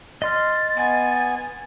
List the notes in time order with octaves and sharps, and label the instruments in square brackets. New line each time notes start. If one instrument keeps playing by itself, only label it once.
[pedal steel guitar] D#5 C6 F6 [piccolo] A6
[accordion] B3 [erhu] G#5